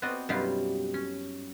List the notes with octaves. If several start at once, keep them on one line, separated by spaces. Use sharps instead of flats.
B3 C4 F#4 C5 D5 D#5
F#2 B2 G3 D#4 F4 F5
C#4